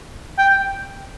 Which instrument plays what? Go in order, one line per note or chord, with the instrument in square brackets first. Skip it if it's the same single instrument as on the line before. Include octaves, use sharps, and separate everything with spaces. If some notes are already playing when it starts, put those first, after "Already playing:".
[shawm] G5